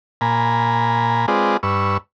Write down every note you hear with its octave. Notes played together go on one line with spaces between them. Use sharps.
A#2 G#5 A#5 B5
G#3 C4 F4 G#4 B4 D5
G2 B4 C#6 E6